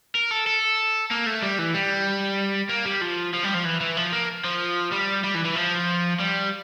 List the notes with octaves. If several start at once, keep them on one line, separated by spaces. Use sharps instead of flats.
A#4
A4
A4
A#3
A3
G3
E3
G3
A#3
G3
F3
F3
G3
F3
E3
E3
F3
A#3
F3
G3
G3
E3
E3
F3
G3